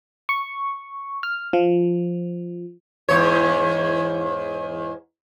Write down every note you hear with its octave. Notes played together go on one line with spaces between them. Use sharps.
C#6
F6
F3
E2 G#2 C#5